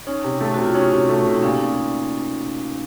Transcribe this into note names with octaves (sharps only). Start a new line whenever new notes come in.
C#4 D#4
C3
A3 A4
C3 F#4
F4
C#4 D#4
C3
A3
C3
D#4
A#2 C#4
D#4